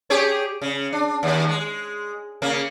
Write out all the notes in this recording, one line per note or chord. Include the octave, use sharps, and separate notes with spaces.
G4 G#4 C#5
C#3
D4
D#2
G#3
C#3 A#3